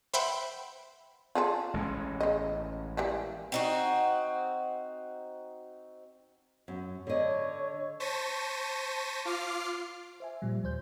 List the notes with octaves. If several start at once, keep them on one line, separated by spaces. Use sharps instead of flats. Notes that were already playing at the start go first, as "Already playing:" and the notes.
B4 C5 E5 F#5 G5 B5
F4 G#4 A4
A1 G#3 C#4
C#3 D#5
E3 G3 A#3
C4 D#4 F#4
F#2
D3 C#5 D#5
C5 A5 C#6 A#6 B6 D#7
F4 D6 F6 C7
C5 E5 G#5
A#2 F3 G3
D#2 C5 G6